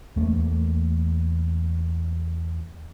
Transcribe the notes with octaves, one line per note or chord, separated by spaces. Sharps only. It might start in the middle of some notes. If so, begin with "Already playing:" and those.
E2 A3 A#3